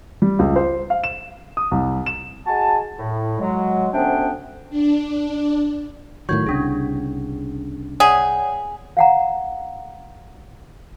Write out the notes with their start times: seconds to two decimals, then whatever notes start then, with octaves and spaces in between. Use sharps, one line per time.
0.22 G3
0.39 C#2
0.56 C5
0.90 F5
1.04 E7
1.57 D#6
1.71 C2
2.06 E7
2.46 G#3 F#4 G#5 A5
2.98 A2
3.40 F#3 G#3
3.93 D2 C3 B3 C#4 D4 G5
4.70 D4
6.29 A2 D#3 F#3 C#6 G6 G#6
6.47 C2 C#3 C#4 D4 G#4
8.00 G#4 C#5 D5 F#5
8.97 F5 F#5 A#5